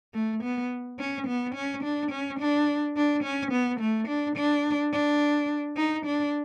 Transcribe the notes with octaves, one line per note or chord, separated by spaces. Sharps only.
A3
B3
C#4
B3
C#4
D4
C#4
D4
D4
C#4
B3
A3
D4
D4
D4
D#4
D4